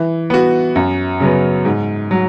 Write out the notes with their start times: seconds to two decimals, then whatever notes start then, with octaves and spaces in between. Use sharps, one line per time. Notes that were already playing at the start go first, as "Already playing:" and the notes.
Already playing: E3
0.30 B3 F#4
0.76 F#2
1.20 C#3 F#3 B3
1.65 G#2
2.11 F#3